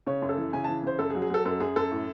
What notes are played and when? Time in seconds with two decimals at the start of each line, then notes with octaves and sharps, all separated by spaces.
0.07 C#3 C#5
0.22 F#2
0.29 A4
0.37 E3
0.53 C#3 G#5
0.64 E3 A5
0.83 C#3 C5
0.99 F#2 A4
1.10 G#4
1.15 F#3
1.22 G#4
1.30 F#3 A4
1.45 F#2 A4
1.60 F#2 G#4
1.76 F#2 A4
1.91 A2